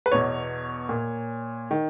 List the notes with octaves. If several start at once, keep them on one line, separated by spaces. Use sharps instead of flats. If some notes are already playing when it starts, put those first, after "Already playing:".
B4
E2 B2 C#5
A#2
D#3